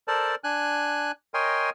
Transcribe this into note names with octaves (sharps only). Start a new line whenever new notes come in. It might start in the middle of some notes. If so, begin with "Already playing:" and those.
A4 A#4 C5 D5 A5
D4 G#5 F#6
A#4 C#5 D#5 G5 G#5 C6